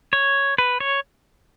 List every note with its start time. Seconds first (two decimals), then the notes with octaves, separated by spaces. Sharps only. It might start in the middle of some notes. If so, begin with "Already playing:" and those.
0.13 C#5
0.58 B4
0.80 C#5